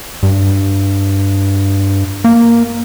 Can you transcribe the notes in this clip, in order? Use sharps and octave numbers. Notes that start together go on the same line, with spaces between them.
G2
A#3